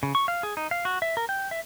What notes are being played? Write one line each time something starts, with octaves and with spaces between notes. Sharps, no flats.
C#3
C#6
F5
G#4
D#4
F5
F#4
E5
A#4
G5
E5